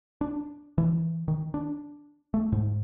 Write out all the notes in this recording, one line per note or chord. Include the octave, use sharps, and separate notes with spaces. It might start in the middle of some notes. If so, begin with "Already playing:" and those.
D4
E3
D#3
D4
A3
G#2